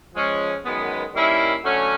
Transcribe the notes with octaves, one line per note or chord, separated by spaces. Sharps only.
F3 G#3 C#4
F#2 D#3 G#3 B3
D#3 G3 A#3 C#4 E4
D3 F#3 A3 C#4